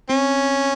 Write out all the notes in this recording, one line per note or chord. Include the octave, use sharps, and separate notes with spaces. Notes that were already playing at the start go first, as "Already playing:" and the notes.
C4 C#4